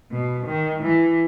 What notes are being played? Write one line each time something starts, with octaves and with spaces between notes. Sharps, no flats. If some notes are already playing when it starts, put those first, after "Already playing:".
B2
D#3
E3